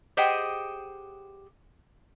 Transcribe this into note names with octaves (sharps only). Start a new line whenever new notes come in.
G4 G#4 C5 D#5 F#5 G5